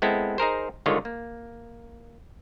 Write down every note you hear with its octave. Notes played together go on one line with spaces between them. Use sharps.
G#3 B3 C4 E4 A4
D#4 G#4 A#4 C5
G1 D3 D#3 G#3 F4 C#5
A#3